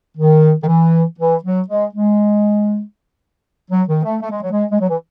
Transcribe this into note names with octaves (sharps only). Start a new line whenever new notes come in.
D#3
D#3
E3
E3
F#3
G#3
G#3
F#3
D#3
A3
A3
G#3
F#3
G#3
G#3
F#3
E3